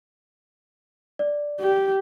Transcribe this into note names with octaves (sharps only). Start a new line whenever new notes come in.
D5
G4